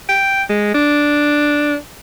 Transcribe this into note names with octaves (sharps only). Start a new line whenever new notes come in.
G5
G#3
D4